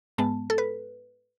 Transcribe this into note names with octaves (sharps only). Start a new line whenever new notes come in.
G#2 G#3 B3 A5
A4
B4